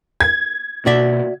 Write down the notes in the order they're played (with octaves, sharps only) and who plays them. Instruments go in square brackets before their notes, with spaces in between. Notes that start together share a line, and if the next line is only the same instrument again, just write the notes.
[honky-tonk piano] G#6
[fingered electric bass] B2 A#3 [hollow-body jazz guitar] F#4 D5 E5